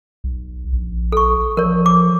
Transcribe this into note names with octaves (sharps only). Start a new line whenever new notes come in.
B1
A#1
A4 C#6
F3 A#4 C#5
D6